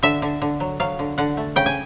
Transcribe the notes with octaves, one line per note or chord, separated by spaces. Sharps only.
D3 E5
D3
D3
F#3
F#3 F5
D3
D3 F#5
A3
C#3 G5
G#5